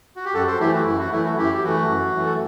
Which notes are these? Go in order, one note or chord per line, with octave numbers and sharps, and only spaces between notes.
F#4
G4
F#2 F#4 A4
A4 C5
E3 A3 E4 G4
F#4
F#2 E4
F#4
E3 A3 E4
F#4
F#2 E4 G4
G4
E3 A3 F#4
F#2
E3 A3
A4